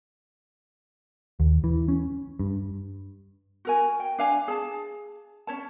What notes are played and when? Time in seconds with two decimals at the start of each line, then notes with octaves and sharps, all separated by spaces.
1.40 D#2
1.64 E3
1.88 C#4
2.39 G2
3.65 F#4 A#4 G#5
4.00 G5
4.18 D4 F5 G#5
4.48 G#4 A5
5.47 C#4 C#5 A5